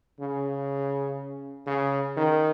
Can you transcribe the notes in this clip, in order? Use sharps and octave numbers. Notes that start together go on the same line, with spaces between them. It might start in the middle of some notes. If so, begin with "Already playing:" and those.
C#3
C#3
D#3